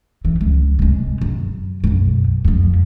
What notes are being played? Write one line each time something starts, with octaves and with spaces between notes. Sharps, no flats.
E3
C#2
C3 G#3
F#2
B1 F#2
F2 F3